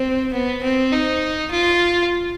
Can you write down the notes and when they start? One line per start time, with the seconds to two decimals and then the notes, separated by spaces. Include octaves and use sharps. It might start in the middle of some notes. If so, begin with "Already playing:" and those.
Already playing: C4
0.33 B3
0.63 C4
0.93 D#4
1.51 F4